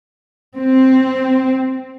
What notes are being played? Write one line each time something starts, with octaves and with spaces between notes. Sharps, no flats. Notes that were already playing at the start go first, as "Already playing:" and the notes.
C4